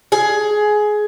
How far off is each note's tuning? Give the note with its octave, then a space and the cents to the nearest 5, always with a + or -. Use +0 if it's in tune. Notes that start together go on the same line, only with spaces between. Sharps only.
G#4 +15